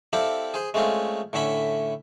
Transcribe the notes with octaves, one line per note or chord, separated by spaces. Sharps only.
C4 E4 G4 A4 D5 F5
G#4 C5
G#3 A3 C4 C#4 F4
A2 D3 C#4 E5 B5